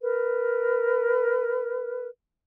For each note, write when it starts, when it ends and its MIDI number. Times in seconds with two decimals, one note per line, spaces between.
0.02 2.07 70
0.02 2.07 71